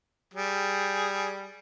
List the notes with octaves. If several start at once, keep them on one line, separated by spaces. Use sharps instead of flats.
G3 G#4